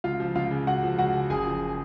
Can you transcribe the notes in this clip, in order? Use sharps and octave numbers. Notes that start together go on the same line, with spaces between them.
C#2 F4 F5
F3
C#2 F4 F5
C#3
C#2 F#4 F#5
F3
C#2 F#4 F#5
C#3
F#1 G#4 G#5
F3